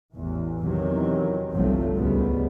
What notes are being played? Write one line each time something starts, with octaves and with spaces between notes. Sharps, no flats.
A1 E2 E3
E2 C3 D#3 F#3
G1 C2 F3 F#3 A3 C4
D2 G#2 C#3 G3 B3